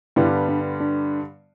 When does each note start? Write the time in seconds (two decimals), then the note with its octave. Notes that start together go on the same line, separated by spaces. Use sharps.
0.16 G2 D3 G3 B3 E4
0.49 D4
0.80 D4